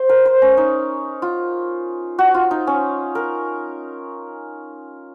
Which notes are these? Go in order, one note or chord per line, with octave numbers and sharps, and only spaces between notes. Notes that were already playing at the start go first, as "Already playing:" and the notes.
Already playing: C5
A#4
C5
C#4
D#4
F4
F#4
F4
D#4
C#4
A#4